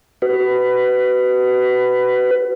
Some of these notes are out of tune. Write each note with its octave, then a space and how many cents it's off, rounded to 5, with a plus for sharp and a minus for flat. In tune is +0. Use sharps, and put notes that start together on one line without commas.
F#4 +30 B4 +15